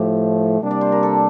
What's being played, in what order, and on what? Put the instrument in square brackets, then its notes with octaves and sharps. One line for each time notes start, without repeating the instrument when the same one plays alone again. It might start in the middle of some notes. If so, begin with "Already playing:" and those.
Already playing: [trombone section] A2 F3 A3 [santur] E4 G4
[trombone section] C3 G3 A#3 D4
[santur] D5
C5
A#4
A4